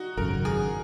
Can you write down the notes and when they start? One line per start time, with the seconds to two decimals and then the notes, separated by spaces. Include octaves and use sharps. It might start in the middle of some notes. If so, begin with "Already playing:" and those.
Already playing: D#4 F#4
0.17 G#1 F#2 C#3 A#4
0.45 G#4